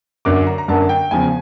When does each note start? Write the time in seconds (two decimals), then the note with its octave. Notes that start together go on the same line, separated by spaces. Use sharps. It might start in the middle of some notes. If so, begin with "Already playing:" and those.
0.25 F#2 D3 F#3 A#3 D6
0.47 A#5
0.58 A#5
0.68 F#2 D3 F#3 A#3 A5
0.89 G5
1.11 E2 C#3 F3 G#5